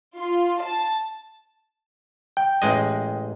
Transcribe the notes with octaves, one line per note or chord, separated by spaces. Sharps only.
F4
A5
G5
A1 G#3 D#5